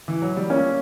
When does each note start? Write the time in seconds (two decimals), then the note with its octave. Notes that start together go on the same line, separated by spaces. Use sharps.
0.08 E3
0.22 F#3
0.37 G3
0.50 A#3 C#4